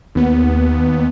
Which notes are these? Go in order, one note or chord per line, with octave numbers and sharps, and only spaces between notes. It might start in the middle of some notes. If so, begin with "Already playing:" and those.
D#2 B3